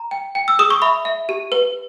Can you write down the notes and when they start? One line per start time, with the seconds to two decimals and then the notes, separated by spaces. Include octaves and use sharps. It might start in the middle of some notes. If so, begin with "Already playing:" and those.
Already playing: A#5
0.11 G5
0.35 G5
0.48 E6
0.59 G#4 D#6
0.70 C#6
0.82 E5 B5
1.05 E5
1.29 G4
1.52 B4